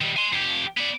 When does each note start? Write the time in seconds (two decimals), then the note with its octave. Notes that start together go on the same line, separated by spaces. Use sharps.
0.01 D#3 G3
0.17 G#5 C6
0.33 F2 G4
0.78 B3 D5